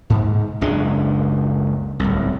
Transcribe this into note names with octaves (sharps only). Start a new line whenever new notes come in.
G#2
F#1 C#2 G#3 D4
D1 C2